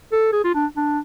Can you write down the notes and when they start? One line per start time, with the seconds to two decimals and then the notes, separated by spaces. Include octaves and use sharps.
0.12 A4
0.33 G#4
0.44 F4
0.55 D4
0.76 D4